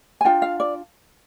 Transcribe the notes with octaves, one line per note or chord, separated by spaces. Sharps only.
G#5
D4 F4 G5
F5
D5